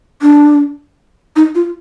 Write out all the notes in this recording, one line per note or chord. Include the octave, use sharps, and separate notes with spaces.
D4
D#4
F4